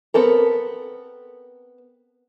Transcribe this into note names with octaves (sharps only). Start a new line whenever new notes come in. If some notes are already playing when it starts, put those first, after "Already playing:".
B3 C4 A4 A#4